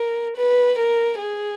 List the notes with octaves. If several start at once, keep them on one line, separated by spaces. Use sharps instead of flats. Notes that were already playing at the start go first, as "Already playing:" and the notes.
Already playing: A#4
B4
A#4
G#4